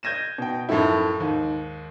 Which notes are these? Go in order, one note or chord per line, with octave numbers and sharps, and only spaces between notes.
G6 G#6 A#6 D#7 E7
B2 G5
F#2 A2 F3 A3 E4
D#2 G#2